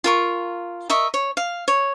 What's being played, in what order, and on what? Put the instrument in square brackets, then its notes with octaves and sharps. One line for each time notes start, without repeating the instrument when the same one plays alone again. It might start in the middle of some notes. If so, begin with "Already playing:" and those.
[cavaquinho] F4 A#4 C#6
A#4 D#5 E5 C#6
C#5
F5
C#5